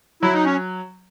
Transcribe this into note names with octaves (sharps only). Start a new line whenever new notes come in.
F#3 E4
D#4
C#4